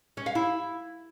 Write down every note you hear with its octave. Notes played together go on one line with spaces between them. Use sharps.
C#4
F5
E4